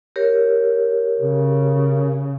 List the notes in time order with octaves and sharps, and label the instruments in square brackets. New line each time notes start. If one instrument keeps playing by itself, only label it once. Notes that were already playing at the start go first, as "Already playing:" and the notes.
[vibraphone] G4 A#4 C#5
[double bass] C#3